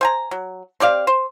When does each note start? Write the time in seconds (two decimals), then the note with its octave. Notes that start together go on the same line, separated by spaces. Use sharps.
0.01 C5 G#5 A#5
0.31 F#3
0.80 C4 G4 D5 F5
1.07 C5